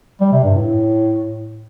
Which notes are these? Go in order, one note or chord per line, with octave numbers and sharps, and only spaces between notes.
G3
C3
G2
A2